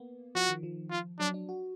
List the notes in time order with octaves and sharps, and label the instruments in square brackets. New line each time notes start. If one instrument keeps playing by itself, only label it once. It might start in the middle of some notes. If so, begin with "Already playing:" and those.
Already playing: [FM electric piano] A#3 B3
[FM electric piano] F3 [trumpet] F#4
[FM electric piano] D#3
F3
[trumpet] F4
[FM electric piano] F#3 [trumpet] D4
[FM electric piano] D4
F#4